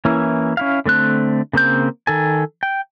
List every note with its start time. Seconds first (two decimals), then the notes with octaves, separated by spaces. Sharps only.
0.05 E3 A#3 C#4 E4
0.57 C#4 E4 F5
0.86 D3 A3 C4 F#6
1.53 C#3 A#3 C4 G6
2.07 D#3 A4 G#5
2.63 G5